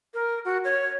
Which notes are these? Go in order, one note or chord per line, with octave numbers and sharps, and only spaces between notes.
A#4
F#4
C#5